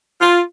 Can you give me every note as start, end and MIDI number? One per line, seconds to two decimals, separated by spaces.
0.21 0.41 65